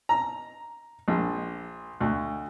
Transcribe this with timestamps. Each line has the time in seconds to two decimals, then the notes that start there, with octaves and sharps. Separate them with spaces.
0.09 A#5
1.08 A#1
2.01 D2